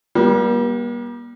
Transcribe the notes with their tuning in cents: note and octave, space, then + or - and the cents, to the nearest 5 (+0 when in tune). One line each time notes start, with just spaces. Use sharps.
G3 +0 A#3 +45